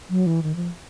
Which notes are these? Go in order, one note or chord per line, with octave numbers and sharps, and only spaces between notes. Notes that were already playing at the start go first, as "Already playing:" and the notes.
F#3
E3
D#3
F3